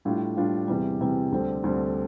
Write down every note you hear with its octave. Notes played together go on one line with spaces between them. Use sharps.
A2 G3 D4 F4
A2 G3 D4 F4
E2 C3 E3 G3
E2 C3 E3 G3
D2 D3 G3 C4
D2 D3 G3 C4